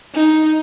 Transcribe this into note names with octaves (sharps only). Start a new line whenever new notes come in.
D#4